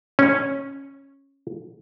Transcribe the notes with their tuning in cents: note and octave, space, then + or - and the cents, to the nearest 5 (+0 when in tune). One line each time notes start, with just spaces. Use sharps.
C#4 -10